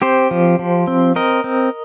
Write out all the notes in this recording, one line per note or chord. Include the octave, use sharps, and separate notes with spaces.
C4 G4 C5
F3
F3
C4
C4 A#4 D#5
C4